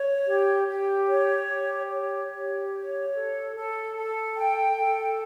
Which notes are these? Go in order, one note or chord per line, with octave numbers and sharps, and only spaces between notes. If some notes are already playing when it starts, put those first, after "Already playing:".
Already playing: C#5
G4
G4
C#5
G4
C#5
G4
C#5
A4
A4
A4
G5
A4